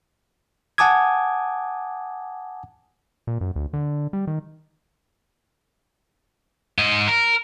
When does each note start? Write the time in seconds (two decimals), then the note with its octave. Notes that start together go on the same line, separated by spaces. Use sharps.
0.78 F#5 G#5 A5 D6 D#6 G#6
3.27 A#2
3.41 F#2
3.56 D2
3.73 D3
4.13 G3
4.27 D#3
6.79 G#2 D#5
7.08 A#4